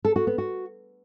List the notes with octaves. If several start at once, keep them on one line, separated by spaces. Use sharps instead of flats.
A4
F#4
B3
F#4